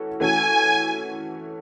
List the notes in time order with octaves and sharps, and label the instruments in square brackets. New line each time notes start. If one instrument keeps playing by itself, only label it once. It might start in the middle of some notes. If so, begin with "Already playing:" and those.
Already playing: [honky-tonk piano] E3 A3 C#4 F#4 A4
[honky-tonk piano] E3 A3 C#4 F#4 A4 [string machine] G#5